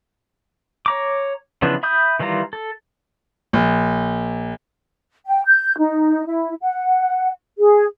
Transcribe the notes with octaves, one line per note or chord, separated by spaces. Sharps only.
C#5 A#5 D6
C#3 E3 F3 B3 D4
E5 B5 D#6 G6
D#3 E3 G3 F4 A#5
A4
A#1
G5
G6
D#4
E4
F#5
G#4